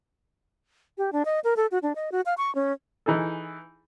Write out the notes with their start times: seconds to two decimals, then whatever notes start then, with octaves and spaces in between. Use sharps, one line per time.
0.98 G4
1.13 D4
1.25 D#5
1.44 A#4
1.57 A4
1.72 F#4
1.83 D4
1.95 D#5
2.12 F#4
2.26 F5
2.38 C#6
2.55 C#4
3.06 E3 D#4 G#4 A4